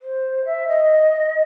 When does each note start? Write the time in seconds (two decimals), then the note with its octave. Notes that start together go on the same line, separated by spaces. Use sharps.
0.02 C5
0.45 E5
0.68 D#5